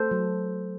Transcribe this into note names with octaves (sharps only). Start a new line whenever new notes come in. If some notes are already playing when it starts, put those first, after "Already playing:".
Already playing: A3 A4 C5
F#3